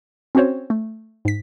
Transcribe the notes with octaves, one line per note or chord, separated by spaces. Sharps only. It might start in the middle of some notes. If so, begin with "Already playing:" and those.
C4 C#4 F#4 C5 C#5
A3
G#2 B6